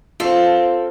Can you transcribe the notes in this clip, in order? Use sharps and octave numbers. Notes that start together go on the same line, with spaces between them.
C4 F4 A4 F5